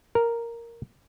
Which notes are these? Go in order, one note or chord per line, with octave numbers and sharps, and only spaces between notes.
A#4